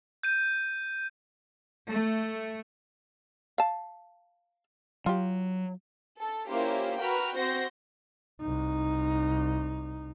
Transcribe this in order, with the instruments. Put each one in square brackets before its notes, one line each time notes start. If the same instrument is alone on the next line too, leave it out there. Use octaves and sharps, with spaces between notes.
[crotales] G6 D#7
[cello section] A3
[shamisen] F5 A5
[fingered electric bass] F#3 [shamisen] F4 G4
[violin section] A4
A#3 C#4 E4 F4 G4 C5
F#4 A#4 B4 G5 B5 F6
C4 F#4 C5 G6 A#6
[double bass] C2 D#4